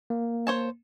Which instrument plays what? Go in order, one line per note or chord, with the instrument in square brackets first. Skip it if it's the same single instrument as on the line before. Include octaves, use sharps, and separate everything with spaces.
[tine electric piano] A#3
[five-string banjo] C5 C#5 A5